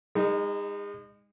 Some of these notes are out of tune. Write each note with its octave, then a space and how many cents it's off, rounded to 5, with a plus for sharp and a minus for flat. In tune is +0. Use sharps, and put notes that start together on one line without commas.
G#3 -35 D#4 +0